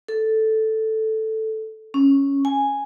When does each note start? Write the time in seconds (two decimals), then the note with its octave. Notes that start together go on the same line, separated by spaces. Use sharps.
0.08 A4
1.94 C#4
2.45 G#5